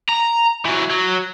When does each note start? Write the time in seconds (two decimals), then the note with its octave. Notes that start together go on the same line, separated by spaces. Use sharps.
0.09 A#5
0.65 E3 F#3
0.91 F#3